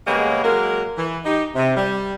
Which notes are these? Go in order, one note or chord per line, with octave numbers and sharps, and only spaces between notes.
C#3 G3 G#3 A#3 B3 C#4
F#3 G#3 A#3 A#4
E3
D#4 G4
C3
G3